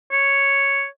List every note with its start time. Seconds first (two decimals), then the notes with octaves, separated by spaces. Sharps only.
0.12 C#5